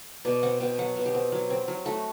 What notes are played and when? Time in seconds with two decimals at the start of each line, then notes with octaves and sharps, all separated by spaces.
0.25 B2 D5
0.43 C4 F#5
0.60 B2 G5
0.78 F#3 F#5
0.96 B2
1.06 G4
1.15 C4
1.32 F#3
1.50 C4
1.68 F#3
1.86 A3 F#4